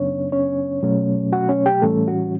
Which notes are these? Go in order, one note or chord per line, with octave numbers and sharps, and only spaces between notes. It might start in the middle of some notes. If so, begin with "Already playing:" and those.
Already playing: F#2 C#3 F#3 B3 C#4 D4 C#5
C#4 C#5
B2 F#3 A3 C#4
F#4 F#5
C#4 C#5
G4 G5
A2 E3 G3 A3 C#4 A4
F#4